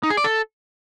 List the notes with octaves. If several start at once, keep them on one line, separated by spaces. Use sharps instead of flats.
D#4
G#4
D5
A4